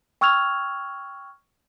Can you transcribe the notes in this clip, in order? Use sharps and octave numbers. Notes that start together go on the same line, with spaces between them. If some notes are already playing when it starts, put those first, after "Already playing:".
G5 C#6 E6 F6 G#6 F7